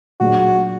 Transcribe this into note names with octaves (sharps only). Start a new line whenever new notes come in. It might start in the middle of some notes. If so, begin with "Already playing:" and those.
A#2 F#3 D4 F#4 G#4